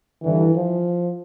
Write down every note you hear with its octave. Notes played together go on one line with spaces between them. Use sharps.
G2 D3 E3
F3